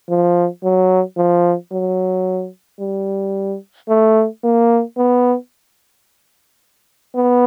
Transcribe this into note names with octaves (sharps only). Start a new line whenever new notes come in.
F3
F#3
F3
F#3
G3
A3
A#3
B3
B3